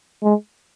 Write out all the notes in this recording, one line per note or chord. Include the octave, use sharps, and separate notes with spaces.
G#3